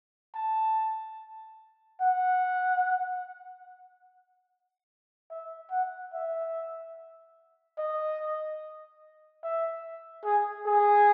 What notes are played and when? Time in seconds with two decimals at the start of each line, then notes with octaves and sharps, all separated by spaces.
0.35 A5
2.01 F#5
5.31 E5
5.71 F#5
6.13 E5
7.78 D#5
9.43 E5
10.25 G#4
10.67 G#4